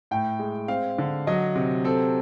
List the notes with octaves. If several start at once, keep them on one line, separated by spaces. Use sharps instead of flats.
A2 G5
G#3
C4 F5
D3
F#3 D#5
C3
C4 A4